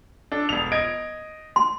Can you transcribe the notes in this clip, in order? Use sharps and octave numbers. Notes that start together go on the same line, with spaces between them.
D4 A4
E1 F7
D#5 G#6 D7
C6